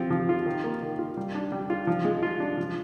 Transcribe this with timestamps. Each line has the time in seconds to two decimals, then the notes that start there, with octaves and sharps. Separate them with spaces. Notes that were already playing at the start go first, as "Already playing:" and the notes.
Already playing: F3 C4
0.10 F3
0.29 F4
0.46 D#3
0.64 A#3
0.82 D#3
0.99 F4
1.17 G3
1.35 D4
1.52 G3
1.70 F4
1.87 F3
2.05 G#3
2.23 F4
2.40 D4
2.58 F3